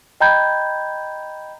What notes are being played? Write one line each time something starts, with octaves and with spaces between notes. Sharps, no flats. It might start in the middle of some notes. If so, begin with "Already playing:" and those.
D#5 G5 A#5 B5 G6 G#6